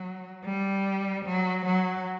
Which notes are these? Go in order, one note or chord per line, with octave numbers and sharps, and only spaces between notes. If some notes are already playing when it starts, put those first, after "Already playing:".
Already playing: F#3
G3
F#3
F#3